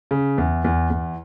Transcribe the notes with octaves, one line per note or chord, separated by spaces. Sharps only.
C#3
E2
E2
E2